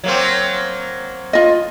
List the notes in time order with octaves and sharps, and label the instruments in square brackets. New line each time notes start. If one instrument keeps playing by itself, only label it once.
[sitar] F#3 A#3 C4
[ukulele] F4 D#5